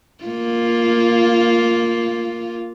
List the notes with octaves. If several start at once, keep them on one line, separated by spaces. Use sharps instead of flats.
A#3 F4